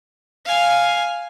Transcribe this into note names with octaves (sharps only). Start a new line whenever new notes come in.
F5 G#5